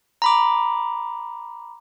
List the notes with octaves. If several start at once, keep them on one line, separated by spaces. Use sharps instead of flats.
A#5 B5 D6